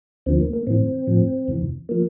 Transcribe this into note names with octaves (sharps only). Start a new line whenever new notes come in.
D2 D3 F3 C4
A#3
A#3
A2 E3 C4
A2 F3
F2 C3 E3
F3 A#3